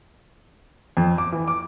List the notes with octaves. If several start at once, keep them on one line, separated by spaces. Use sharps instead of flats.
F2
D6
E3
D6